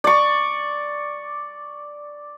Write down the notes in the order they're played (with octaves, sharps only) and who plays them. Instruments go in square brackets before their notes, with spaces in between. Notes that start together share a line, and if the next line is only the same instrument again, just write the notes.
[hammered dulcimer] D5 C#6